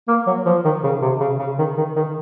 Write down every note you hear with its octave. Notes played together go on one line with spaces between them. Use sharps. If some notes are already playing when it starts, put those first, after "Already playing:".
A#3
F#3
F3
D#3
C#3
C3
C#3
C#3
D#3
D#3
D#3